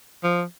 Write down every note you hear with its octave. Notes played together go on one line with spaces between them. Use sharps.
F3